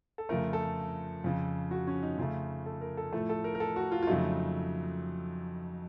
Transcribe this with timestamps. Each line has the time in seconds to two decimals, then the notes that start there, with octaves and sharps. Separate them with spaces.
0.18 A4
0.29 F2 C#3 F3 A3 A#4
0.53 A4
1.24 F2 C#3 F3
1.71 F#4
1.87 C#4
2.03 D#4
2.18 F2 C#3 A3 F4
2.66 A4
2.81 A#4
2.97 A4
3.12 A2 F3 A3 A4
3.29 A4
3.44 A#4
3.55 A#4
3.60 A4
3.76 F#4
3.92 F4
4.03 F4
4.07 F2 C#3 F#3 A3 D#4